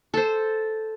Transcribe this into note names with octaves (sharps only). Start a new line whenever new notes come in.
A4 C5